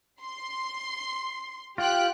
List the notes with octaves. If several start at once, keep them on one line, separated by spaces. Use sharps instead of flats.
C6
F4 G4 G5 F#6